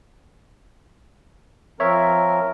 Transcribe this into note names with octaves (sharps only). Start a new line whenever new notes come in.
F3 C4 A#4 C#5 E5